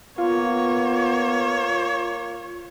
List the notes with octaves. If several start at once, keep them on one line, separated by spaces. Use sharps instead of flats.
A#3 B3 F4 C#5